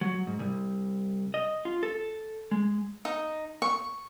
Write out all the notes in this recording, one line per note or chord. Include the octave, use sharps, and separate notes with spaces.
F#3
G#2
C2
D#5
F4
A4
G#3
D#4
C#6